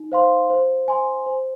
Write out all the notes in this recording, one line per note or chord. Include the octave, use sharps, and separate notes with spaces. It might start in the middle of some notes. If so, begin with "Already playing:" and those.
Already playing: D#4
C5 F5 C6
C5
G#5 C6
C5